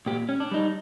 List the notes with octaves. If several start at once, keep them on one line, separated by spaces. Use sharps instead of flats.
A#2 G4
C#4
D4
G3 D#4